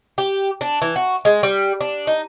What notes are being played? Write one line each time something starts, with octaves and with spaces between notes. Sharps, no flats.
G4
D4
E3
F#4
G#3
G3
D4
D#4